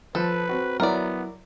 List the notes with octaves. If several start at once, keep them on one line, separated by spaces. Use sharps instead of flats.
F3 A4 B4
C4 F#4
F#3 B3 E4 A#4 D5